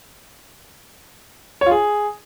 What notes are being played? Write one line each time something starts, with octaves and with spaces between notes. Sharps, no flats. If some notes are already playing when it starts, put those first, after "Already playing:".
C#5
F4
G#4